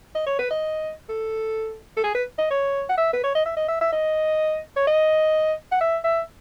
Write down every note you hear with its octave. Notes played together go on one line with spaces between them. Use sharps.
D#5
C#5
B4
D#5
A4
A4
G#4
B4
D#5
C#5
F#5
E5
B4
C#5
D#5
E5
D#5
E5
E5
D#5
C#5
D#5
F#5
E5
E5